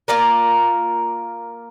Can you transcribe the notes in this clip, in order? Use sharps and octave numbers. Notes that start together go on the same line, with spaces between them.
A#3 F4 A#4 D5